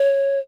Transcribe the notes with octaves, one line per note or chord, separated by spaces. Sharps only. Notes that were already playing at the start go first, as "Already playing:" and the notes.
Already playing: C#5